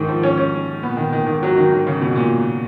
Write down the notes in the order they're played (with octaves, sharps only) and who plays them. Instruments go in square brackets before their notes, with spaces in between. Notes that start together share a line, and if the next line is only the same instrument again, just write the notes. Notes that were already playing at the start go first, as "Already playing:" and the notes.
Already playing: [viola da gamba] G#2 [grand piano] D#3
[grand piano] F3
C#4
C#4
[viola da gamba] A#2 [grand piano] B3
[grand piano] D#3
D#3
[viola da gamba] G#2 [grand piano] D#3
[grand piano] F#3
D#3
D#3
C#3
B2
A#2